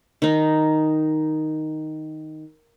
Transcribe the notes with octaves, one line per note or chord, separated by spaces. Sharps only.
D#3 D#4